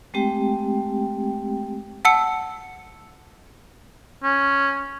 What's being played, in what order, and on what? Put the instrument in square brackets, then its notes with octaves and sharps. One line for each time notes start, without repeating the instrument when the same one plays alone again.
[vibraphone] G#3 A3 C4 G4 G5
[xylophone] F#5 A5 E6 C#7
[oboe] C#4